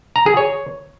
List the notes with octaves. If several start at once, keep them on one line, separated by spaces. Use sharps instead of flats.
A#5
G#4
C#5